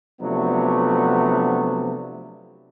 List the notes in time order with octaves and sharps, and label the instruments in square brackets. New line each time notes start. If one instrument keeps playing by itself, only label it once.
[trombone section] C3 F3 F#3 A3 B3 D4